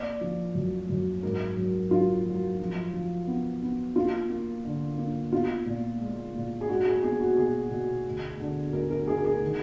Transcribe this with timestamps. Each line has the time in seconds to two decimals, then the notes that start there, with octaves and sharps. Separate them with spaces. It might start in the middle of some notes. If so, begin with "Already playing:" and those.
Already playing: A#3 D5
0.21 F3
0.54 F#2
0.89 F#2
1.23 G#2 A#4
1.57 F#3
1.91 F#3 F4
2.25 F#3
2.59 F3
2.93 F3
3.27 B3
3.62 B3
3.96 A#3 F4
4.30 A#3
4.64 D3
4.98 A#3
5.32 B3 F4
5.66 A#2
6.00 G#3
6.35 A#2
6.61 G#4
6.69 G#3 F#4
6.86 G#4
7.03 B3 G#4
7.20 F#4
7.37 B2 G#4
7.71 B2
8.05 D2
8.40 D3
8.73 D2 A#4
8.90 A#4
9.07 D2 G#4
9.17 A#4
9.25 G#4
9.42 D#3